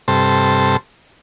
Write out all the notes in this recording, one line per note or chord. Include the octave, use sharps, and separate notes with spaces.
G2 C3 A4 C5